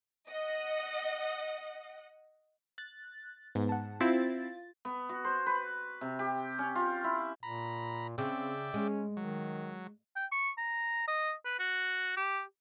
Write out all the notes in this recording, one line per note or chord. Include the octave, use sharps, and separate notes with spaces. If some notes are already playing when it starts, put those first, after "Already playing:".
D#5 F#5
F#6 A6
G#2 B3
F#5 A5
C4 E4 F4 A6
B3
F#4
C5
B4
C3
G4
C#4
F4
E4
A#2 A#5 B5
C#3 C4 D5 E5 G5
G#3 C#4
D#3 F#3
G5
C#6
A#5
D#5
B4
F#4
G4